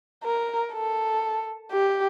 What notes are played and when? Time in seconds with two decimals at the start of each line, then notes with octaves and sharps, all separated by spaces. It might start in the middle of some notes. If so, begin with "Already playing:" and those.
0.24 A#4
0.73 A4
1.72 G4